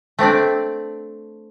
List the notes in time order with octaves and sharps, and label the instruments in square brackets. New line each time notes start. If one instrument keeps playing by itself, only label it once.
[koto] A3 C4 D4 D5